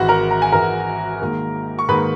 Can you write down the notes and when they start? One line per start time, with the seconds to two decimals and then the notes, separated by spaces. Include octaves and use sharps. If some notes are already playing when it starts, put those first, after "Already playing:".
Already playing: G#1 G#2 E3 F#4 F#5
0.09 A#4 A#5
0.31 A#5
0.42 G#5
0.52 G#1 G#2 E3 A#4 A#5
1.21 G#2 D#3 A#3
1.79 C#6
1.88 G#2 D#3 A#3 B4 B5